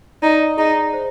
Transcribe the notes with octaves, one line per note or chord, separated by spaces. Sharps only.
D#4 D5
D#4 G#4
C5